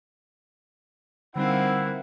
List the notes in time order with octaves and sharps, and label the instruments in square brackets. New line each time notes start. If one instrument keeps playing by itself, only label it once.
[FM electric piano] D3 G3 D#4 [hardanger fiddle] A#3 C4 [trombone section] E4 [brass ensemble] F#5